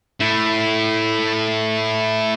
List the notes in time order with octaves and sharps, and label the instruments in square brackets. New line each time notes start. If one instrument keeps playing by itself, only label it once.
[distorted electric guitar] A3 E4